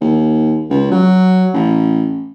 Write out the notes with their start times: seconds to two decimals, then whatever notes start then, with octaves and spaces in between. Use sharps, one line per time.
0.01 D#2
0.70 C#2
0.91 F#3
1.54 A1